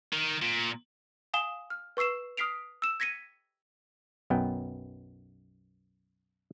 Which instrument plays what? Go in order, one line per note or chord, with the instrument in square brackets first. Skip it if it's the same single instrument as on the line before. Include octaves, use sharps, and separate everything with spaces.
[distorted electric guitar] D#3
A#2
[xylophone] F5 G#5 D#6 E7 G7
F6
B4 C#6 E6 C7 E7
D#6 F6 B6 C7 D7 F7
E6 E7
G#6 A#6 B6 C#7 D#7
[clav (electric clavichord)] B1 F#2 B3 G5